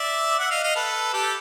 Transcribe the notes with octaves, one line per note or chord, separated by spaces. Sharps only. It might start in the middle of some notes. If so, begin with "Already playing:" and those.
Already playing: D5 E5
E5 F#5
D#5 F5
D#5 F5
A4 B4
G4 A4